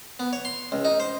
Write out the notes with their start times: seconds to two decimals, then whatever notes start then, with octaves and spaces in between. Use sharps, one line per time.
0.20 B3
0.33 C#5
0.45 C6
0.72 C#2
0.85 D#4
1.00 C5